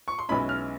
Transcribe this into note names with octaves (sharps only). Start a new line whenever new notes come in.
C#6
C6
B1 B2 G#3 C#4 E4 B5
F6